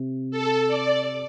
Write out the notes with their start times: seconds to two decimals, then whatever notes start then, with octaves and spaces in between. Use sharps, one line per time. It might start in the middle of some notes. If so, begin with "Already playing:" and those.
Already playing: C3
0.31 A4
0.68 D5